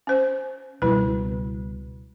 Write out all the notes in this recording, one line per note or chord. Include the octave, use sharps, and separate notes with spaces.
C#4 C5
C#2 B2 G3 E4 B4